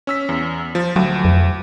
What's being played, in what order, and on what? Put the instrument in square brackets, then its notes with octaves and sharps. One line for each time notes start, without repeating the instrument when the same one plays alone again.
[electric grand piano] C#4 E6 B6
E2
F3
[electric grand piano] D2 [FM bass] F#3
[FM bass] F2